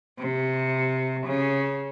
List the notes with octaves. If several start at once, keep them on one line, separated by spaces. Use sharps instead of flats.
C3
C#3